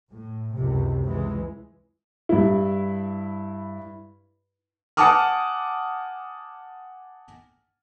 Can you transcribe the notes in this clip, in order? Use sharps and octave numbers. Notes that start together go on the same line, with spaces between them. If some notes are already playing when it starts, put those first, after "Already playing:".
A2
C#2 F#2 C3
C#2 E3 G#3
G2 E4
F#5 G#5 A5 D6 D#6 F6